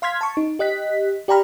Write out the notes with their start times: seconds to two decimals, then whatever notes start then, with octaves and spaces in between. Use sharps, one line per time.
0.02 F5 C6 F6 G#6 B6
0.21 A5 C#6
0.37 D#4
0.59 G4 D#5 F#6 B6
1.28 G4 D5 G5 A#5 B5 F6